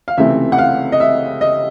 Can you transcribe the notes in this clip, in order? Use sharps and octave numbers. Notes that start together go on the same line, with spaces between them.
F5
C#2 C3 E3 A3 C4 E5
F#5
F5
D#5
E5
D#5